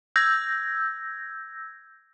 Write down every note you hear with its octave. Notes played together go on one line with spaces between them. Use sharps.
E6 G6 G#6 A#6